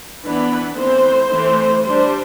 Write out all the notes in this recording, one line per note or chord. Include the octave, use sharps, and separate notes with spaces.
E3 B3 D4 B4
E3 A3 C4 C5
E3 A3 C4
G3 D4 C5